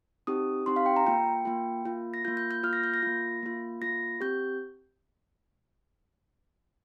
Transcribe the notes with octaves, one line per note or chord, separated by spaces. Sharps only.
C4 D#4 G4 D#6
C4 D#4 G4 C6
F5
G5
A#5
A#3 F4 G5
A#3 F4
A#3 F4
A#6
A#3 F4 G6
G6
G6
A#3 F4 F6
A#6
G6
A#6
A#3 F4
A#3 F4
A#3 F4 A#6
C4 G4 G6